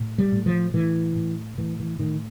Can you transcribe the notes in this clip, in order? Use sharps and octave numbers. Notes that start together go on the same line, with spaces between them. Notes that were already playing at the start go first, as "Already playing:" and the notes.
Already playing: A2
G3
A2
F3
A2 E3
A2
A2 E3
E3
A2 D#3